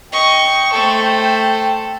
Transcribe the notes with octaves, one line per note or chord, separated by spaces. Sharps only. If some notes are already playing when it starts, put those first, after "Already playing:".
D#5 G5 C#6
A3 A4 C5